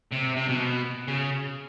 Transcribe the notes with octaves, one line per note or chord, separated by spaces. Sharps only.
C3
C3
B2
C#3